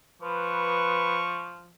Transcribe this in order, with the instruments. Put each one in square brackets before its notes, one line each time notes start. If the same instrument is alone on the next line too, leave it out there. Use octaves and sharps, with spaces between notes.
[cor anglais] F3 [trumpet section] B4 [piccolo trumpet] C#6